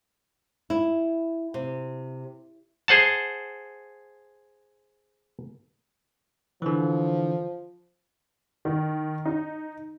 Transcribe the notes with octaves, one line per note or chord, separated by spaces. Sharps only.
E4
C3
G#4 C5 F#5 A5
D3 E3 F3
D#3
D#4